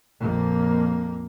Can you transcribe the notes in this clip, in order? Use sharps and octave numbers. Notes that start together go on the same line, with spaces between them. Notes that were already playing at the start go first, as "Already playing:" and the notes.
A#1 F2 A#3